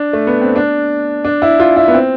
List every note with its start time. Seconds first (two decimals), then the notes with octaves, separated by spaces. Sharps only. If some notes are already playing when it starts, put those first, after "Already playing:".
Already playing: D4
0.13 A3
0.27 B3
0.41 C4
0.56 D4
1.25 D4
1.42 E4
1.60 F4
1.76 E4
1.88 B3
1.94 C4